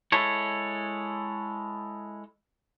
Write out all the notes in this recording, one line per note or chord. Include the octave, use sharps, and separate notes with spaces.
G#3 E4 A4 C#5